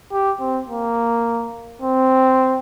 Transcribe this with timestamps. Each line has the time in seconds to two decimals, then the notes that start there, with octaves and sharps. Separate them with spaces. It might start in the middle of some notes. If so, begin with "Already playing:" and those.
0.12 G4
0.40 C4
0.69 A#3
1.82 C4